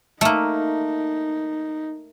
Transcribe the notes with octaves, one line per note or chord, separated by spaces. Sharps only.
A3 A#3 D#4